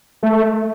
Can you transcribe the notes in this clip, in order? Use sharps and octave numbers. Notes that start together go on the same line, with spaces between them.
A3